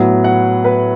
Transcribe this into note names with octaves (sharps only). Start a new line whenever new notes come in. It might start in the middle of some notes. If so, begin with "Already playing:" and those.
Already playing: A2 F#3 B3
F#5
B4